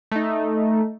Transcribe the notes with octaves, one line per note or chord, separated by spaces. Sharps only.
A3 D#4